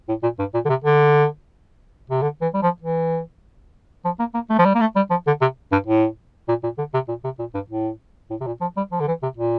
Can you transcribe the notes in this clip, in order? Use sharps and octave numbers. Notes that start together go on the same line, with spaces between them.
A2
A#2
G2
A#2
D3
C3
D3
C3
D3
E3
G3
F3
E3
F3
A#3
A#3
A3
F3
G3
A#3
A3
G3
F3
D3
C3
G2
A2
A#2
A#2
D3
C3
A#2
C3
A#2
G2
A2
A2
C3
A#2
F3
G3
F3
D3
E3
C3
A#2